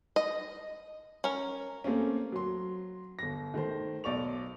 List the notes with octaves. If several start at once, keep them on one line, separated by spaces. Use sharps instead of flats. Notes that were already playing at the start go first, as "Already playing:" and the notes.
D#5
C#4 A#4
A3 A#3 C4 C#4
F#3 C6
G1 A#6
D#3 A3 C5
B1 D5 C#6 F7